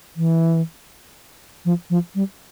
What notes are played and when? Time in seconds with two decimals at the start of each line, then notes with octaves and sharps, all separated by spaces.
0.16 E3
1.65 F3
1.90 F3
2.15 G3